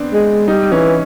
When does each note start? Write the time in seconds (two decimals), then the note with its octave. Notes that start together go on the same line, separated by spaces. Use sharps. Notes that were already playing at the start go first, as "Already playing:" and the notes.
Already playing: B3 C4 D4
0.13 G#3
0.48 G3 D#4
0.72 E3 C#4